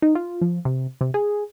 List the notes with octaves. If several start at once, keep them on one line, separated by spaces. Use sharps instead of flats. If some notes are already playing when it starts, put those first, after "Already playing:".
D#4
F4
F3
C3
C3
G#4